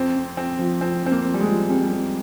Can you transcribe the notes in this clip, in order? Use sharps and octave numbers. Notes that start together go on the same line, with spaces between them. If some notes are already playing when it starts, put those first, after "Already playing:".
Already playing: F2 C4
F2
F2 C4
F3
F2 C4
F2 C4
A#3
F2
G3
G#3
F3
F2 G3
G3
F2